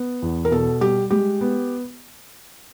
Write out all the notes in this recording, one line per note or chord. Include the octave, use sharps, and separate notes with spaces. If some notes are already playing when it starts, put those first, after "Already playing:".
Already playing: B3
E2
A#4
B2 A4
G3 G4
G#3 G4
B3